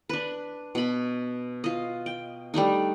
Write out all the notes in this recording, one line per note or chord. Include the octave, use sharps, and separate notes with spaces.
D4 B4
B2 B5
F4 D#5
G5
G3 A3 D4 D#4